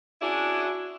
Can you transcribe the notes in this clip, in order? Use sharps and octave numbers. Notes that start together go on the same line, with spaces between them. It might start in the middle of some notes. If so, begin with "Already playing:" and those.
C#4 D4 E4 F#4 G#4